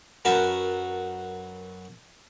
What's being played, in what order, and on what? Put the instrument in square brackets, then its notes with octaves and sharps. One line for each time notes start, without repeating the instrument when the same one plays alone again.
[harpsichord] F#2 F#4 A#4 B4 A5